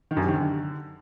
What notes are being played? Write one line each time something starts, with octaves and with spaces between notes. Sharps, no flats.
D#3
F#2
C3
D#3
D3